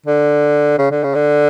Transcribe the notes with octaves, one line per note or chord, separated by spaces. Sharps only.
D3
C#3
D3
C#3
D3